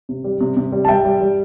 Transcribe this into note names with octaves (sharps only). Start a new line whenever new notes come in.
C3
G3
C3
C3
G3
A5
G3 E5 G5
G3
G3